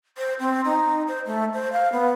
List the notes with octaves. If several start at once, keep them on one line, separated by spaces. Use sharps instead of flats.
C5
C4
D#4
C5
A3
C5
F5
B3